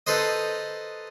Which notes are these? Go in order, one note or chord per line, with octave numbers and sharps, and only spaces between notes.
D#4 A4 B4 C5 D#5